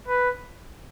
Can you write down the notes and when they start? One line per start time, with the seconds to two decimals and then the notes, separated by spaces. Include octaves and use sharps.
0.08 B4